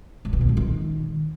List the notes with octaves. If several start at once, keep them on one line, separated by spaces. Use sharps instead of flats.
A2
B2
A2
G#2
D#3